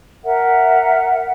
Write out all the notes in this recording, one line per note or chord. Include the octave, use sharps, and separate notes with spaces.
A#4 E5 F#5